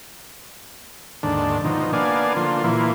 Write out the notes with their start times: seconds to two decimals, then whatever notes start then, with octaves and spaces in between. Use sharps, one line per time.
1.23 D#2 G#2 D3 D4
1.64 B2 F3 D#4
1.93 A#3 B3 D4 D5 F5 G#5
2.36 D3 F3 A#3 F4
2.64 A#2 E3 A#3 E4 F4